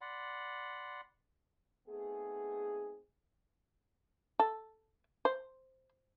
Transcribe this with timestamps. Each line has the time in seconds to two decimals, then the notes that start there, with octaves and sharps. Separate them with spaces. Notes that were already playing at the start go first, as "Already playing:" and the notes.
0.01 D5 F#5 B5 C6
1.89 A3 B3 C4 D#4 G#4
4.40 A4
5.25 C5